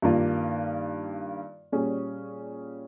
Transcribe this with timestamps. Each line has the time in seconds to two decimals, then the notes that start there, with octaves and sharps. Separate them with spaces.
0.02 G2 D#3 A#3 F4
1.72 A#2 G3 C#4 G#4